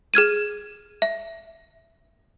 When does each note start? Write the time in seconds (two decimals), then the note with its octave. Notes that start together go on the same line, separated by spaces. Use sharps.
0.14 G#4 F6 G#6 D#7
1.02 E5